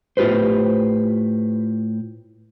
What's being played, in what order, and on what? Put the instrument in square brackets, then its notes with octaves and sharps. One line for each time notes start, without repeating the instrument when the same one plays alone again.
[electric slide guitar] A2 F4 G4 B4 C5